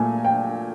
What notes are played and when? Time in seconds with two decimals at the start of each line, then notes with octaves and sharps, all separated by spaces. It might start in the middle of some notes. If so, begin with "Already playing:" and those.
Already playing: A#2 A3 G#5
0.25 G5